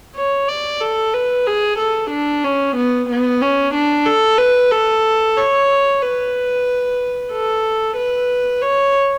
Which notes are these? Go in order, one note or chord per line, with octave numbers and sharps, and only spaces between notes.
C#5
D5
A4
B4
G#4
A4
D4
C#4
B3
B3
C#4
D4
A4
B4
A4
C#5
B4
A4
B4
C#5